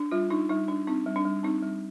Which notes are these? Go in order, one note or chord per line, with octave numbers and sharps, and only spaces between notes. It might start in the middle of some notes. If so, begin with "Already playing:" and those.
Already playing: D4
G3 F4
D4 D#4
G3 D#4
D4
C4 D#4
G3
D4
G3
C4 D#4
G3